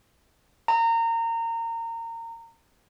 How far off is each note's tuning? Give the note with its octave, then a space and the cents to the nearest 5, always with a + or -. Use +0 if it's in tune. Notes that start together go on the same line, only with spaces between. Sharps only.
A#5 -25